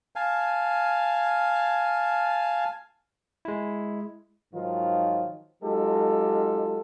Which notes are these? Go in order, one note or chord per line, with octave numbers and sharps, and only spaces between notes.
F5 G#5 A5
G#3 E4
G#2 D#3 F3 F#3 D#4 F4
F#3 G#3 D#4 F4 G4 A4